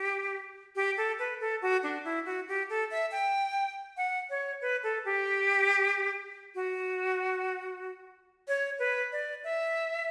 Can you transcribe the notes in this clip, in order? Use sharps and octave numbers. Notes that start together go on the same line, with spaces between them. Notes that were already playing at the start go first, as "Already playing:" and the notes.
Already playing: G4
G4
A4
B4
A4
F#4
D4
E4
F#4
G4
A4
E5
G5
F#5
C#5
B4
A4
G4
F#4
C#5
B4
D5
E5